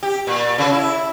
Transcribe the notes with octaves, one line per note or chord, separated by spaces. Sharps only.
G4
A#2
C#3
E4